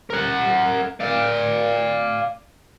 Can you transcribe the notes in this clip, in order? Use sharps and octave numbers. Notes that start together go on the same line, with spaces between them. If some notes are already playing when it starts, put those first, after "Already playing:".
A#4 F#5
D5 F5